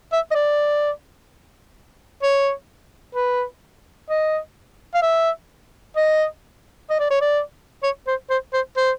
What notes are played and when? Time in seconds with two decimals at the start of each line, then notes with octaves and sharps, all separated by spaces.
0.12 E5
0.31 D#5
0.34 D5
2.23 C#5
3.15 B4
4.10 D#5
4.94 F5
5.02 E5
5.96 D#5
6.90 D#5
6.99 D5
7.10 C#5
7.21 D5
7.83 C#5
8.07 C5
8.30 C5
8.53 C5
8.77 C5